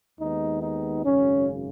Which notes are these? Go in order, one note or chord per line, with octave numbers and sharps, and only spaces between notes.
D#2 D#3 G#3 B3 D#4
D#4
G#1 F#2 C#3 C#4